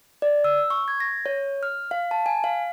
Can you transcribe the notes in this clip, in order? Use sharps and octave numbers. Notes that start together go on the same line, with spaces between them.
D5
E6
C#6
G#6
A#6
C#5
F6
F5
A5
G#5
F5